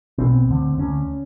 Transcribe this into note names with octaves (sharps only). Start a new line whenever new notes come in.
B1 B2 C4
D2 D3
D2 D3 C#4